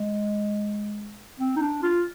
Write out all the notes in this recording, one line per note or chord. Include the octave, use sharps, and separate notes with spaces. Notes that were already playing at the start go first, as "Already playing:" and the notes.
Already playing: G#3
C4
D#4
D4
F4